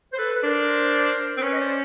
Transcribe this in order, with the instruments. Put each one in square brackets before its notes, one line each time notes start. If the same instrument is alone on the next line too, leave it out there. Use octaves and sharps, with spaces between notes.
[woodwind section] C5
A4 B4
B4
[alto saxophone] D4 [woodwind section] A#4 C5
[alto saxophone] C4
[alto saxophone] C#4 [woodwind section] B4 C#5
[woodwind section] D#5
C5 D5